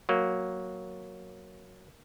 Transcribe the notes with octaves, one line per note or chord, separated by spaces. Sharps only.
F#3 A#3